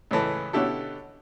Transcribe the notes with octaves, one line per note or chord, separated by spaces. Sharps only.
C#2 A2 E3 A4
B2 D3 C#4 E4 G4 A4